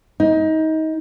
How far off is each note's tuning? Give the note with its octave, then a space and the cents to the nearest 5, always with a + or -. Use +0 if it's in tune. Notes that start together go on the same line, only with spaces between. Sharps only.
D#4 +25